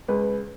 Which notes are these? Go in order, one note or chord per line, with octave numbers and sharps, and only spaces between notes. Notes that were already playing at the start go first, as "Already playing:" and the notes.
C#2 B4